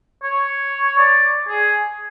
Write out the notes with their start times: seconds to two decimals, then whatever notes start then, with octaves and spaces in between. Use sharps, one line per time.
0.23 C#5
0.98 D5
1.48 G#4